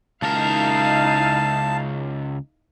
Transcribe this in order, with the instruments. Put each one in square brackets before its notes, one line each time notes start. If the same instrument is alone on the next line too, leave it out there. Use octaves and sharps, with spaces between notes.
[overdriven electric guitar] C#2 A#4 [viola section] D#4 E4 F5 [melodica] A5